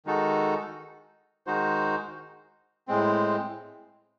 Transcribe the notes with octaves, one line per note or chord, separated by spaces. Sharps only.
D#3 G#3 D#4 F#4 A4
D#3 G#3 D#4 F#4 C5
A2 G#3 C4